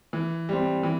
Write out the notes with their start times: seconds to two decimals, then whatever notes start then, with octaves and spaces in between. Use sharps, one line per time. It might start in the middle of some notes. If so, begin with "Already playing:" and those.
0.13 E3
0.49 G3 C4
0.83 E3